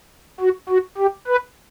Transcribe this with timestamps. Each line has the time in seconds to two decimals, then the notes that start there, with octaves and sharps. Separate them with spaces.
0.40 F#4
0.69 F#4
0.98 G4
1.28 B4